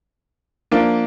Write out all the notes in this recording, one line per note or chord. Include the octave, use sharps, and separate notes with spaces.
F3 A#3 D4